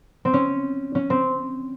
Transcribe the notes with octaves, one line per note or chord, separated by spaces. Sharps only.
C4
C#4
C#4
C4